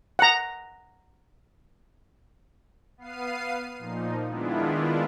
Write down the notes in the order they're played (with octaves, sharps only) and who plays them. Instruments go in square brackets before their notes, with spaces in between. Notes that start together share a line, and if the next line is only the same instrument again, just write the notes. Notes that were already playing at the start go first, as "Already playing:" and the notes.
[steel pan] F#5 A#5
[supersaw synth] B3 F5 C7 D#7
A#2 F3 D#4
D#3 G#3 B3 D4 E4 F4